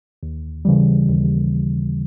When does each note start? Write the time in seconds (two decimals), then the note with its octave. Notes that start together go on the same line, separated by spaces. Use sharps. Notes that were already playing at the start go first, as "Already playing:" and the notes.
0.23 D#2
0.65 C#3 E3 G3
1.10 D#2